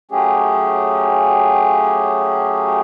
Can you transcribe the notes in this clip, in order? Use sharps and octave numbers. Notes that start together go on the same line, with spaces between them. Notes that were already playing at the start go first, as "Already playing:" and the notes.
F#3 A3 C#4 G4 G#4